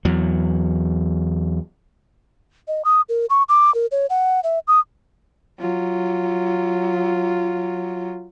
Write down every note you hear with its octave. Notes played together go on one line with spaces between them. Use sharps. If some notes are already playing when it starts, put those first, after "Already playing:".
E2 F#3
D#5
D#6
A#4
C#6
D6
A#4
C#5
F#5
E5
D#6
F#3 F4